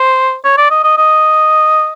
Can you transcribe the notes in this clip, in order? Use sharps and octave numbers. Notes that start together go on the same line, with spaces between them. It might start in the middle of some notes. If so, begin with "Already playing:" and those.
Already playing: C5
C#5
D5
D#5
D#5
D#5